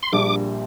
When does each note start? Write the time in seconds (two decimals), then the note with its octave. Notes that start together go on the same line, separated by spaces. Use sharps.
0.03 C6
0.12 A#1 A#2 G3 D4 D6